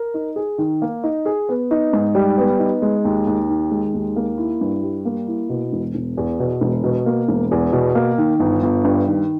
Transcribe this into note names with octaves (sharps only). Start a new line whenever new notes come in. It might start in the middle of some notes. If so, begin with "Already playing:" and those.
Already playing: A#4
D#4
G#4
D#3
A#3
D#4
G#4
B3
D#4
G#2
G3
B3
D#4
G#3
D#2
D#2
D#3
G#3
D#2
A#3
E4
G2
G3
A#3
E4
B2
E1
E1
E2
B2
E1
B2
A#3
E1
E2
B2
A#3
D#3
G1
G1
G2
D#3